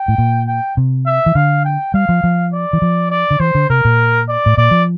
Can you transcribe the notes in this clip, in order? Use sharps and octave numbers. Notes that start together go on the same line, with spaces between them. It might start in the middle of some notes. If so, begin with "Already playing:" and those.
Already playing: G5
A2
A#2
G5
C3
E5
E3
D3 F5
G5
G3 F5
F3
F3
D5
E3
F3
D5
D3
E3 C5
D3
C3 A#4
A#2
D5
A2
A#2 D5
F3